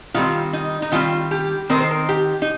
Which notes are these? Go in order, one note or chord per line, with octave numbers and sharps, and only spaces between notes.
D#3 G3 C4 F4
D#4
D#4
D#3 G3 C4 F4
G4
D#3 C4 D#4 A#4
C5
A#4
G4
D#4